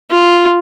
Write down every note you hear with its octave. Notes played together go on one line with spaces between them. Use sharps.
F4